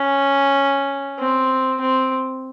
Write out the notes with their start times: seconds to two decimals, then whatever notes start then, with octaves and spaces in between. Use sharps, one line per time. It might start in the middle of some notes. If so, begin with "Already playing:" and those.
Already playing: C#4
1.19 C4
1.81 C4